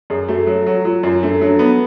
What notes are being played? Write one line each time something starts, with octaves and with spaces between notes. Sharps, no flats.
F#2 G#4
A3 F#4
F#3
F#3 F#4
F#3 F4
F#2 F4
A3 D4
F#3 D4
B3